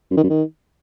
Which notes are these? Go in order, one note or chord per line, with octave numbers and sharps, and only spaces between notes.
F#2
D#3
F#2
D#3